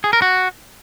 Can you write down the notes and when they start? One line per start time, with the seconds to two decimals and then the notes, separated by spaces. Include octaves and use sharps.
0.04 G#4
0.13 A#4
0.22 F#4